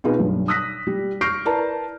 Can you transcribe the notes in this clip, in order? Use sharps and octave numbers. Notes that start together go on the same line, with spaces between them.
B2 C4 D#4 F4 G#4 B4
B1 G2
D#6 E6 F#6 A#6 B6
G3
C#6 F6 G6 A#6 C7 D7
E4 A#4 B4 D5 A5 A#5